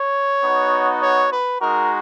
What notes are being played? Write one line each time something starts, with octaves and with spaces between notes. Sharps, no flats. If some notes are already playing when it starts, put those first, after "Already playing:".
Already playing: C#5
B3 D#4 F#4
C#5
B4
G#3 D#4 F#4 A#4